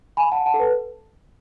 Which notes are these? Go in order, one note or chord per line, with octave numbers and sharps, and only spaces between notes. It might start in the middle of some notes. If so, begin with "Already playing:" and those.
G#5 B5
F#5 A5
F#5 A5
A4
B4